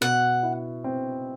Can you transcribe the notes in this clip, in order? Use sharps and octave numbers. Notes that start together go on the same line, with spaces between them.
B2 F#5
E4
C4